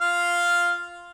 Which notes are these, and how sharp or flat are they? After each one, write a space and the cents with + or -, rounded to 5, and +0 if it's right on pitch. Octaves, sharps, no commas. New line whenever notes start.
F4 +0 F5 +0